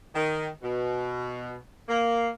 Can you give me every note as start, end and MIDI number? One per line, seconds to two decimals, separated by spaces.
0.15 0.47 51
0.62 1.55 47
1.88 2.27 58